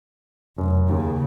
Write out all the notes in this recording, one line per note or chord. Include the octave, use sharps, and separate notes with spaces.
F1 F#2
D#2 C#3